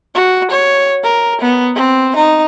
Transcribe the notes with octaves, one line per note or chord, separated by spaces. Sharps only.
F#4
C#5
A#4
B3
C4
D#4